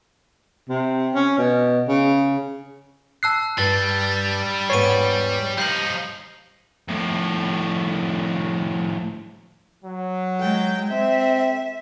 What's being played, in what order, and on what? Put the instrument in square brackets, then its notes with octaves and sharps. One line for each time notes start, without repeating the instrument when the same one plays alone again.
[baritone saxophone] C3
C#4
B2
C#3
[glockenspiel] A5 E6 F#6 [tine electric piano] C7
[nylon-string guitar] G2 [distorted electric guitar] G3 [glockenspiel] A6 G7
[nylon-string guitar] E2 G#2 B3 [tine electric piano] C#5 [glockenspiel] C7 D#7
[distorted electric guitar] F3 D#4 [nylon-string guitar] G3 [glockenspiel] G6 C7 F#7
[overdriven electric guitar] F2 A2
[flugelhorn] F#3
[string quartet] G#3 G5
[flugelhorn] C4 [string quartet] E5